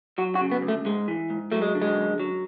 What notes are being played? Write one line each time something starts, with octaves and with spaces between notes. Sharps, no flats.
F#3 F#4
F#4
C#3
B3
D2
A3
G#2 G#3
E3
G#2
F#3 A3
G#3
D3
G#3
F#2
F#3